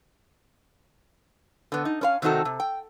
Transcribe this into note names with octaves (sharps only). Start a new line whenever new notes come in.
D3 B3
D#4
C#4 B4 F5
C3 D#3 C4 D#4 F#4 A4
C3
G5